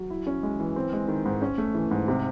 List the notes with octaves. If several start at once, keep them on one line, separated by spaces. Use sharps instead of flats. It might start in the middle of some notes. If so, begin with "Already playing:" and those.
Already playing: F#3
E4
C#4
G#3
E3
C4
G#3
D#3
G#2
C#4
A3
E3
G#2
C3